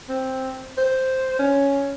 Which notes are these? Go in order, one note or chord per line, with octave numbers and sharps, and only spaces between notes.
C4
C5
C#4